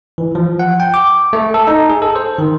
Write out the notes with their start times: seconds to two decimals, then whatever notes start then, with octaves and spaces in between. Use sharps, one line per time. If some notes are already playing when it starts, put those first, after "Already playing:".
0.18 E3
0.35 F3
0.59 F#5
0.80 G5
0.94 D6
1.33 A3
1.54 A4
1.67 D#4
1.90 G#4
2.02 A4
2.16 C5
2.38 D#3